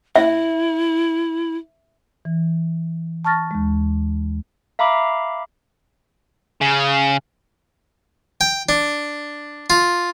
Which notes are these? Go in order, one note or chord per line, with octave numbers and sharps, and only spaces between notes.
E4 E5
E3
A5 C#6 F6 A6 A#6
D#2 G#3
E5 F5 A#5 B5 D6
C#3
G5
D4
F4